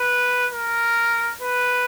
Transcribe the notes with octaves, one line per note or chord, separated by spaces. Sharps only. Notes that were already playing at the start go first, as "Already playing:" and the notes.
Already playing: B4
A#4
B4